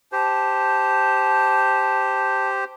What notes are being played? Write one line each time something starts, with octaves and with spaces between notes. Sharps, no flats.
G4 C5 A5